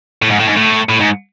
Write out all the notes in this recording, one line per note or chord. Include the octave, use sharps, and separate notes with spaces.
A2
G#2
A2
G#2
A2
A2
G#2